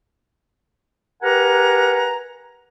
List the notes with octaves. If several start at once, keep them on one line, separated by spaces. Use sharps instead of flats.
G4 A#4 B4 F#5 G#5 A#5